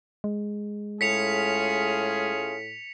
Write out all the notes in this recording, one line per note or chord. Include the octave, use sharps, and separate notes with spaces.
G#3
A2 C#4 F4 G#4 B6 C#7 F7